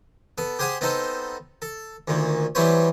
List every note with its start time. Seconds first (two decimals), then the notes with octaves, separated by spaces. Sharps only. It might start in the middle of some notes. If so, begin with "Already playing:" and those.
0.38 B3 A4
0.59 G4 G#4 C5 F#5 G#5
0.81 B3 C4 D#4 A4 C5
1.62 A4
2.08 D2 A#2 D#3
2.55 E3 F#3 G3 B3 C5 C#5